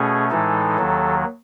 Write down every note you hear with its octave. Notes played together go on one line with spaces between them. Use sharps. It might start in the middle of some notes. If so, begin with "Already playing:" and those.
Already playing: B2 A3 C#4 G#4
A2 E3 G#3 D#4 A4
D#2 D#3 F#3